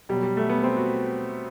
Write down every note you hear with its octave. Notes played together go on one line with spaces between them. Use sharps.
B2 F#3 G3
G3
A3
B3
C4
F#4